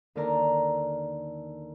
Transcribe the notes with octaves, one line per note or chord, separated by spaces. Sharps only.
D#2 D3 A4 A#4 D5 A#5